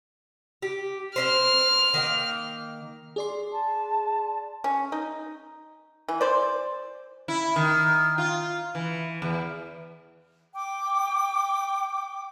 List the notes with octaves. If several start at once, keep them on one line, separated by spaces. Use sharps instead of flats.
G4
C4 C#4 C5 F6
D#3 A#3 G5
G#4 D5 C6
A5
C#4
D#4
E3
C5 D5
E4
D#3
F4
E3
E2
G5 D6